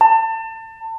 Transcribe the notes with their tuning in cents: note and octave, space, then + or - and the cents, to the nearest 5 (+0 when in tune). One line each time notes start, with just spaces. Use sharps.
A5 +30